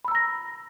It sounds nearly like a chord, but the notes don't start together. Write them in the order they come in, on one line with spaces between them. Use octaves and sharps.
B5 E6 A#5 A#6